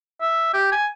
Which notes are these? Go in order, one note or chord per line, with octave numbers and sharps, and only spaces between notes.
E5
G4
G#5